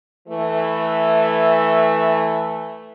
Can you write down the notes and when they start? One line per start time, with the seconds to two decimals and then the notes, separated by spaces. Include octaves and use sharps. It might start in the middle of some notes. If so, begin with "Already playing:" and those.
0.28 E3 A3